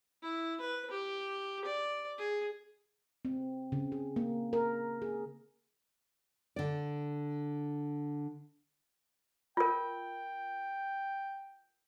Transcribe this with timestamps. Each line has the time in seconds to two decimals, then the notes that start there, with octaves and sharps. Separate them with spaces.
0.22 E4
0.61 B4
0.90 G4
1.65 D5
2.18 G#4
3.25 C4
3.72 C#3
3.92 G#4
4.16 A#3
4.53 A#4
5.02 G#4
6.56 D3 D5
9.57 F4 A#4 G5